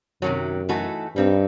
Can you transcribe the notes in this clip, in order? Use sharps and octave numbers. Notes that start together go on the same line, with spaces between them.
F#2 C3 D#3 F#3
E3 A3 D#4 F#4 A4
G2 G3 C4 D#4